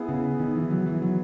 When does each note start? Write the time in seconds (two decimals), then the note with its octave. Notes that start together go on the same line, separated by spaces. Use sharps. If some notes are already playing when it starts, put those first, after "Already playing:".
Already playing: B3 E4 G#4 B4
0.09 C#3
0.40 D#3
0.55 E3
0.71 F#3
0.86 E3
1.02 F#3